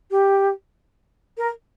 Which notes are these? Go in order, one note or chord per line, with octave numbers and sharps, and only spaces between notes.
G4
A#4